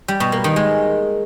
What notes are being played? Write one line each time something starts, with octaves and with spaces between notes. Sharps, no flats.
G3
B2
A#3
D#3
G#3